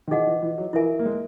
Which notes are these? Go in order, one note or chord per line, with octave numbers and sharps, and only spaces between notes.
D#3
E3 D#4 G#4 D#5 F#5
E3
E3
F#3
E3 E4 A#4 E5 G#5
A#3
G#3